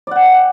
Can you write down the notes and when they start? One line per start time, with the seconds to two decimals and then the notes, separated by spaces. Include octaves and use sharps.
0.07 D5
0.11 F#5
0.16 G5